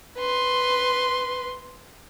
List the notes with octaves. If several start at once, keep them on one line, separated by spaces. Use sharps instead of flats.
B4 C6